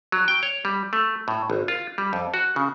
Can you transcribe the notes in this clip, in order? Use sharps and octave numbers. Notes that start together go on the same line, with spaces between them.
F#3
G5
C#5
G3
A3
A2
G#1
F4
G3
F2
F#4
C#3